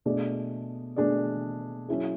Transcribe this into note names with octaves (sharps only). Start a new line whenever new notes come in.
B2 A3 D4 G#4 D5
B2 A3 D4 G#4 D5
F#3 C#4 E4 G#4